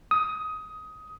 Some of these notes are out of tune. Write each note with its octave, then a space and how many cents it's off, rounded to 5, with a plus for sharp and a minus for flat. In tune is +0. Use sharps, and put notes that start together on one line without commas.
D#6 +15